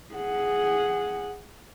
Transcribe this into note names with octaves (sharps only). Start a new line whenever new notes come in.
G#4 F#5